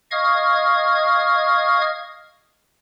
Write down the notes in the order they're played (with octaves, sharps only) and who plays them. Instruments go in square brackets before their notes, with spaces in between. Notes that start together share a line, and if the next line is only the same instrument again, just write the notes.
[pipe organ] D#5 F5 C#6 D#6 F6 G#6